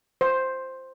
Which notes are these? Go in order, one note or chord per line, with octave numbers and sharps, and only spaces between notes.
C5